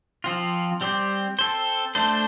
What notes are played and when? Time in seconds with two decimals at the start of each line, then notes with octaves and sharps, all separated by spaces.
0.24 F3 C4 F4
0.81 G3 C4 G4 C5
1.39 C4 A4 C5
1.95 A3 D4 A4 C5